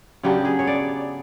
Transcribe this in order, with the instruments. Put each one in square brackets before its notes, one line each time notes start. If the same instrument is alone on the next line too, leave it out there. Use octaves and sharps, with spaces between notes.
[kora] C#3 F#3 B3 D4 G4
G#4
C#5
D5